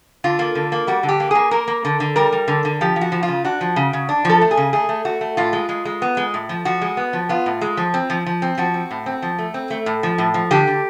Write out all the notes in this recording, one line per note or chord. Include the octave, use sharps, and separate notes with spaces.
D3 F4
A#3
D3
A#3
G3 F#4
D3
G4
A#3
A#3 G#4
A#3 A#4
A#3
D3
D3
G3 A#4
G3
D3
D3
F3 G4
F3
F#4
F3
F4
C#3
D4 F#4
F3
C#3
C#3
D4
F3 A4
A3
G#4
C#3
A3 G#4
A3
A3 F#4
A3
A2 F4
G#3
G#3
G#3
B3
G#3
A2
F3
F3 F#4
G#3
B3
F3
B3 F4
A2
G#3
F3
C4
F3
F3
C4
F3 F#4
C4
A2
C4
F3
A3
C4
A3
A2
F3
A2
F3
D3 G4
D3